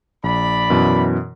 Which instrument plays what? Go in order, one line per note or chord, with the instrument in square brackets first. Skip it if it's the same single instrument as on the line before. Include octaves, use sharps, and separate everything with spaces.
[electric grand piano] A#1 [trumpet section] D5 B5
[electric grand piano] F#2 B2 E3